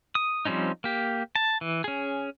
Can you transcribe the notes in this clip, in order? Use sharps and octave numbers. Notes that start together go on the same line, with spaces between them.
D#6
F3 G3 C4 C#4 D#4
A#3 G4
A5
E3
C#4 G#4